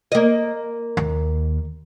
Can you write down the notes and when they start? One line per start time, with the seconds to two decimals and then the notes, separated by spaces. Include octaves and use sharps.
0.12 A#3 D#5
0.97 D#2